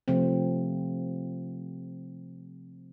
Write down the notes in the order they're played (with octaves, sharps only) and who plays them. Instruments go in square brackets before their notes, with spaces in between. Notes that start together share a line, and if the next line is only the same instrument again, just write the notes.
[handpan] C3 F3 A3 C4